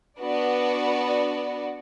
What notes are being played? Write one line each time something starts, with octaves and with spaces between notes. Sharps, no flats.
B3 D4 F#4 B4 D5